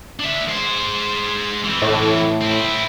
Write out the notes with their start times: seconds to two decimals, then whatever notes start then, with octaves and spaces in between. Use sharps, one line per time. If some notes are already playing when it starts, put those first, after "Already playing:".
0.19 D4 E5
0.48 G#3 C5
1.65 E3 C4
1.82 A2
2.42 C4 E4